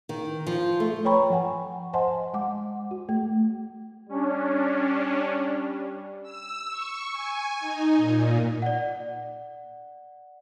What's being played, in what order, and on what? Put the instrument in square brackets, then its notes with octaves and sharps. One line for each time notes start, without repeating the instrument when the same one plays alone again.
[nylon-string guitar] D#3
F3
A3
[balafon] B4 C#5 G5 A#5 B5 C#6
F3 F#5 G#5
C5 D#5 F#5 G#5 A5 C6
G#3 F#5 D6
F#4
A3
[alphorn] G3 [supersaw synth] C#4 D4
[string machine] E6
C#6
G#5
D#4
A#2
[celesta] D5 F#5